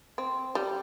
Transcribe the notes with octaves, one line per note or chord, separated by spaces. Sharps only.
C4
G3